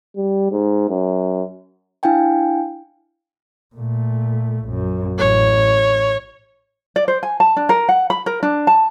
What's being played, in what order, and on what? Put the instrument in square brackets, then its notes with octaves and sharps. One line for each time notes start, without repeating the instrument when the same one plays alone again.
[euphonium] G3
G#2
F#2
[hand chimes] D4 E4 F5 G5 G#5
[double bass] A#2 A3
A#1 F#2
[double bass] A1 [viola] C#5
[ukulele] D5
C5
G#5
A5
D4
A#4
F#5
B5
A#4
D4
A5